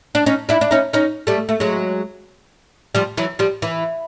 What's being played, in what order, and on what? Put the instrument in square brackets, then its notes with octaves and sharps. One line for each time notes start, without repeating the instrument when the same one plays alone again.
[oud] D4
C#4 D#4
D4 E4
D4
C#4 D#4
C#4 D#4
G3 A3
A3
F#3 G#3
F3 G3
E3 F#3
F3 G3
E3